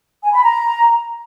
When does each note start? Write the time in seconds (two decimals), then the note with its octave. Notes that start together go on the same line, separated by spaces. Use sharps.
0.23 G#5
0.33 B5
0.43 A#5